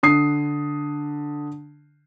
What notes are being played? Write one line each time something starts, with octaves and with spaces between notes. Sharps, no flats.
D3 D#6 C7